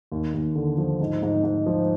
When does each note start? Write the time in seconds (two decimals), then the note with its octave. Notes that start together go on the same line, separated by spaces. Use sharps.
0.12 D#2
0.34 D#2
0.56 D3
0.78 F3
1.00 G#2
1.22 G#2
1.43 G#2
1.66 F3